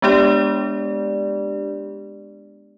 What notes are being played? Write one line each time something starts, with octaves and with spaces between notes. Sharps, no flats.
G#3 B3 D4 G4 D5